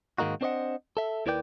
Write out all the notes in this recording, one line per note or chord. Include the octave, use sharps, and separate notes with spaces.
G#2 D#3 G#3 A#3 D#4 F#4
C4 D4 C5 C#5 D#5 F#5
A4 E5
D#2 E4 A#4 B4 D5 G5